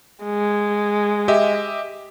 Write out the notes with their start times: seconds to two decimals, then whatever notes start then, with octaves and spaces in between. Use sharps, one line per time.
0.24 G#3
1.28 G4 D#5 E5